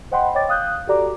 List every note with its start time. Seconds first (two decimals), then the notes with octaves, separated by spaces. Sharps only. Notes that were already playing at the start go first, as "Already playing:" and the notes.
0.11 C5 D#5 F#5 G5 B5 C6
0.35 C#5 D#5 G5 D6 A6
0.48 F5 D#6 F#6 G6
0.87 F#4 G4 A4 D5 A#5 D6